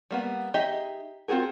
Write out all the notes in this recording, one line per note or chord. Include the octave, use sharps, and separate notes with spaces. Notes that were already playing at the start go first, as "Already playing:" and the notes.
G3 A#3 B3
D#4 G4 G#4 D#5 E5
C4 F4 F#4 G#4 A#4